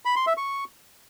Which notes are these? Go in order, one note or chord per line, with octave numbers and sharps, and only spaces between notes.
B5
C6
E5
C#6